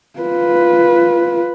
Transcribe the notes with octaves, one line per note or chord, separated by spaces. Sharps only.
F4 B4